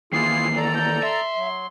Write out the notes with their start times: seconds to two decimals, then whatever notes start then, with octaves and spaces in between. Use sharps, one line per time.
0.13 D#3 E3 A#3 E4 F4 G#4 C7
0.56 A4 D5 A#5
0.75 G6
1.03 E5 C6
1.37 F#3